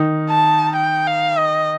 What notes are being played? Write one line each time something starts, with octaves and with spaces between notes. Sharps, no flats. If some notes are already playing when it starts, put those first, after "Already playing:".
Already playing: D#3 D#4
A5
G5
F5
D#5